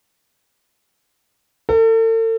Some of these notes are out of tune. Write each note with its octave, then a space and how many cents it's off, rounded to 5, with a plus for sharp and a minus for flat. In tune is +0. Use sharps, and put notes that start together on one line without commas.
A4 +40